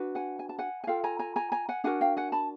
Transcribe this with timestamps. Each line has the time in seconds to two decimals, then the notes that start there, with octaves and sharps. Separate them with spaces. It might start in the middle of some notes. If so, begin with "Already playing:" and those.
Already playing: D4 F#4 B4
0.15 F#5 G#5
0.39 G#5
0.49 A5
0.59 F#5 G#5
0.84 G#5
0.87 F4 A4 F5 G5
1.04 G#5 A#5
1.19 G#5 A#5
1.36 G#5 A#5
1.52 G#5 A#5
1.69 F#5 G#5
1.84 D4 F#4 A#4 F#5 G#5
2.01 F5 G5
2.17 F#5 G#5
2.32 A5 B5